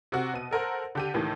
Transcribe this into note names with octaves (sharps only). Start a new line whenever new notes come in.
C3 F#4
B2 D#7
A4 A#4 C5 F#5
D3 G4 D#7
C#2 A2 D#3 E3